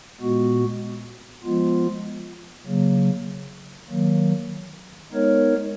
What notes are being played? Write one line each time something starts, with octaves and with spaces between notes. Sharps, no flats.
A#2 G#3 B3 F#4
F3 G#3 B3 F4
C#3 F#3 A#3
D#3 F#3 A#3
G#3 B3 D#4 A#4 C#5